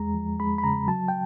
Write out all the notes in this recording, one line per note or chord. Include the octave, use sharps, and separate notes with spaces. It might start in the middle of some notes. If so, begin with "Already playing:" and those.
Already playing: E2 G#3 A#5
F3
G#3 B5
B5
C#3 A#5
F#3 A5
G5